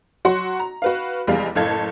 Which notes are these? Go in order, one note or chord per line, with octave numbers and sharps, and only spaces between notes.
F#3 F#4 F#5 C6
A#5
F#4 B4 F5
F1 E2 G3 G#3 F5
F#1 A2 A4 F5 G#6